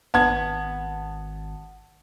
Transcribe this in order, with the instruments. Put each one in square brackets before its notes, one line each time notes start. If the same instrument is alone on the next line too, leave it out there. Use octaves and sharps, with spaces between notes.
[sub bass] G#1 [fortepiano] B3 [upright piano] A5 G#6